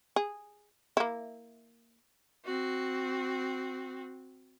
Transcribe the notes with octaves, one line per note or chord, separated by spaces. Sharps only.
G#4
A#3 E4
C4 F#4